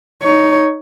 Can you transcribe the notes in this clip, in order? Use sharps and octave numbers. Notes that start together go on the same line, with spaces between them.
D#4 C#5